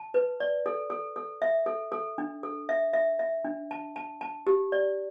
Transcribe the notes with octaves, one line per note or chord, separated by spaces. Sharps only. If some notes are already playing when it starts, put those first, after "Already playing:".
Already playing: A5
B4
D5
A4
A4
A4
E5
A4
A4
D4
A4
E5
E5
E5
D4
A5
A5
A5
G4
D5